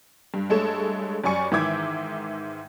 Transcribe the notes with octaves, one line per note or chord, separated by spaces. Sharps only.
G2
G2 G#3 A3 A4 C#5 E7
F#2 G3 D5 G#5 C#6 C#7
G#2 D#3 E3 E5 D6 G#6